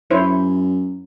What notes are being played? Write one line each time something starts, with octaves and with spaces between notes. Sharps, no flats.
F#2 E4 C5 C#5